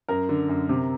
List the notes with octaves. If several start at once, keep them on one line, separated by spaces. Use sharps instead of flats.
F#2 A#4
D3
F#2
C3